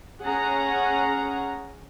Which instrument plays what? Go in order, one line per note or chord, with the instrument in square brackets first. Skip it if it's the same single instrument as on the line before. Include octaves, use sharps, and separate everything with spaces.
[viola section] C#4 G#4 F#5 A#5